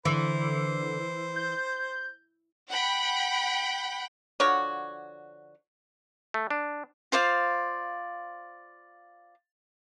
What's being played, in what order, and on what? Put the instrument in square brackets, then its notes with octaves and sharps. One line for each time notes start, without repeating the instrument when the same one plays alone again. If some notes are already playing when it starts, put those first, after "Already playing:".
[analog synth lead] D3 [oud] E3 [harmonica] C5
[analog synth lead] G6
[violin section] F#5 G5 B5
[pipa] D3 F3 F#4 C#5
[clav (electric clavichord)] A3
D4
[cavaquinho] F4 C5 D5 F5